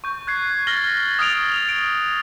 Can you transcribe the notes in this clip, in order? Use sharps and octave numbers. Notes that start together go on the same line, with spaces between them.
C#6 G6
F#6 G#6 C7
F6 A6 A#6 F#7 G7
D#6 F6 A6 D7 F7
D7